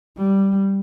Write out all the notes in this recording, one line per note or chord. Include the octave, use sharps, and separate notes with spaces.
G3